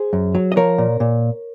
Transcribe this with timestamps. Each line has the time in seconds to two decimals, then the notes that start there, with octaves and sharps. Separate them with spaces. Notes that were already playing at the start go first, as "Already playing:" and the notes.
Already playing: G#4 C5
0.13 F#2
0.35 F#3
0.52 D#5
0.57 F3 A#4 C#5
0.78 A#2
1.00 A#2